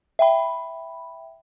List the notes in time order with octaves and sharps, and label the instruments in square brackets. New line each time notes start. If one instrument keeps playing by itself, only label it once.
[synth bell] E5 G5 B5